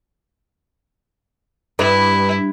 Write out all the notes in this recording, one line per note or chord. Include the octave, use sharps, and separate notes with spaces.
G2 E4 B4